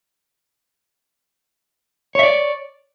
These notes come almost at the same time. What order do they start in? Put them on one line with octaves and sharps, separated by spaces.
C#5 E5 D5